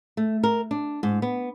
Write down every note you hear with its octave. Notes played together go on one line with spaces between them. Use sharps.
A3
A#4
D4
G#2
B3